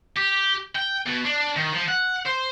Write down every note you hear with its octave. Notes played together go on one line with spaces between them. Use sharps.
G4
G5
B2
D4
D#3
F3
F#5
C5